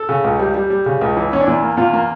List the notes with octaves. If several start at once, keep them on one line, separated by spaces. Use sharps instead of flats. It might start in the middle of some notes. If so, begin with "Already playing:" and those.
Already playing: A4
C#3
C#2
G3
G3
G3
C#3
C#2
E3
E2 C#4
D4
E2 E4
A#3
E2 F4
A#3